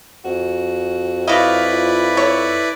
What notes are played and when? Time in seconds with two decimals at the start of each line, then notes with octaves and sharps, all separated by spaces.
0.25 F2 F#4
1.27 E4 F#4 B4 D5 D#5 F5
1.66 F4
2.17 A4 C#5